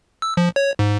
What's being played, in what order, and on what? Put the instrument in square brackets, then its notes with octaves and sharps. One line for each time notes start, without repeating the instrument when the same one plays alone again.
[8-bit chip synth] E6
F3
C#5
G#2